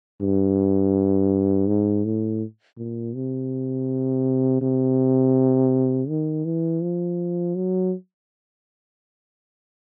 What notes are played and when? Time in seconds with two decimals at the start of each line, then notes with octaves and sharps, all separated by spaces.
0.21 G2
1.67 G#2
2.05 A2
2.78 A#2
3.15 C3
4.61 C3
6.08 D#3
6.45 E3
6.82 F3
7.55 F#3